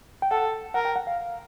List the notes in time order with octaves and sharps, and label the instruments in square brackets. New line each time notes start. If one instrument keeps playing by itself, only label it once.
[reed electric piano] G5
[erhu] A4 [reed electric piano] F#5
[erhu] A#4 [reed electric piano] F#5
[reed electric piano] G5
F#5
F5